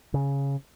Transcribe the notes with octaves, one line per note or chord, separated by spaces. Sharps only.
C#3